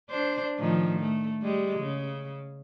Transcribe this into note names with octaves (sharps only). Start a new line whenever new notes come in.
D4 C5
A2 D#3 F3
A3
G3 G#3
C#3